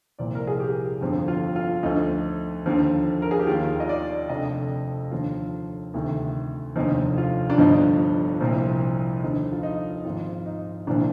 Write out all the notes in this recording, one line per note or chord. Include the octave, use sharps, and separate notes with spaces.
C2 A#2 F3 D5
A#4
G#4
G4
G1 F2 D3 F3
F4
F4
D2 D3 F3 D#4
D#2 D3 F3
A#4
G#4
G4
D#2 D#3 F4
D#5
D5
F1 F2 D3 D#5
D#2 D3 F3 F4
D2 C3 D#3
F1 D#2 D3 F3 D#4
F4
D4
G1 G2 D3 F3 D#4
C2 A#2 F3
D#2 D3 F3 D#4
F4
D#4
G#1 G#2 F3 F4
D#4
C2 A#2 F3 D4